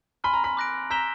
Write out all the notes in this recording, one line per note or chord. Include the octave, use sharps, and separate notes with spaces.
G#5 B5 C6 F6
A#5
B5
D6 F#6 A#6 D7
A#5 E6 G6 B6 E7 G7